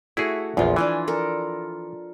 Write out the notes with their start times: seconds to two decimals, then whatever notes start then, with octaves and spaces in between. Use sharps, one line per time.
0.17 A3 E4 F#4 G#4
0.57 A#1 E2 F3 F4
0.76 E3 D4 F4 G#5
1.08 A4 A#4